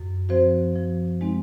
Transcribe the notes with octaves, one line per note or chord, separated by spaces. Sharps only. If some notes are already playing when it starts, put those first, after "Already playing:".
Already playing: F#2
F3 C4 F#4 C5
F3
G#3 C4 D#4